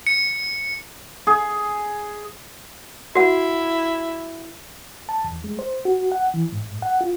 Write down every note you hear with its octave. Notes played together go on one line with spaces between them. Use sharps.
C#7
G#4
E4 F#4 F#5
A5
E2
G#3
C5
F#4
F#5
E3
G#2
F#5
F4